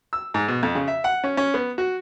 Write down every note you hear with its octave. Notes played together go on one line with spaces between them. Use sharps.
E6
G#2
B2
F2
C#3
E5
F#5
C#4
C#4
B3
F#4